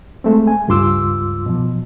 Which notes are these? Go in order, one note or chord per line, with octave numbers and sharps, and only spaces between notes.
G#3 A3 C4
G#5
C#2 G2 F4 C6 D6 E6
B2 F3